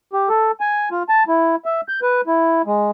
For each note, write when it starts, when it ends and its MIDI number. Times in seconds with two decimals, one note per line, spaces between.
0.13 0.29 67
0.29 0.51 69
0.60 0.89 80
0.92 1.03 65
1.09 1.23 81
1.28 1.56 64
1.65 1.81 76
1.88 2.00 91
2.02 2.21 71
2.27 2.62 64
2.66 2.91 56